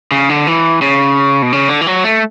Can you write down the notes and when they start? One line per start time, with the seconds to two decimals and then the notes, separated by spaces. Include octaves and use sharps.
0.11 C#3
0.30 D3
0.47 E3
0.82 C#3
1.42 B2
1.53 C#3
1.69 D3
1.81 E3
1.87 F#3
2.04 A3